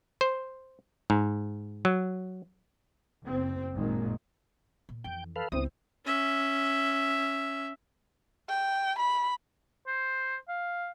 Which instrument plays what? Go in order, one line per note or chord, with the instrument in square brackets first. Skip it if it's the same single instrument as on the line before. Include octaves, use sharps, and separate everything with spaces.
[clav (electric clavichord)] C5
G#2
F#3
[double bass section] F#1 C4
G#1 F#2 A#2 D#3 G#3 A#3
[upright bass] A#2
[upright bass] F2 E3 [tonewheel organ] G5
[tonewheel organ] A4 B4 F5
[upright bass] C#2 G2 [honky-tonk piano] B3 C4 E4 [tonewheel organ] D#6
[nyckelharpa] C#4 E5
[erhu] G5
B5
[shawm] C5
F5